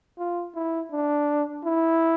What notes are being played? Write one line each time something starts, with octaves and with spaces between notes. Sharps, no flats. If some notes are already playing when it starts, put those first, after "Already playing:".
F4
E4
D4
E4